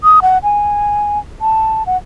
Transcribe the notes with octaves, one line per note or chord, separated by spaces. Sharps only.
D#6
F#5
G#5
A5
F#5